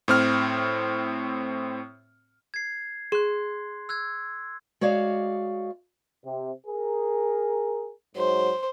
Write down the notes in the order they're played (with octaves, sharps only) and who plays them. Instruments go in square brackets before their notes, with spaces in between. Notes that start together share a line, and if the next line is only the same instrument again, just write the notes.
[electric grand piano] A2 C4 F6
[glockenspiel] G#6 C7
[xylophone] G#4 [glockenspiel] C6 F#6
[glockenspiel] E6 F#6 G#6
[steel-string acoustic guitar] G#3 F#4 C#5 D5 F5
[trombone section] C3
G#4 A#4
[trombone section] G#2 F#3 [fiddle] C5